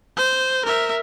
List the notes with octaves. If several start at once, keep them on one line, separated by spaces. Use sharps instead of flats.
C5
A#4 E5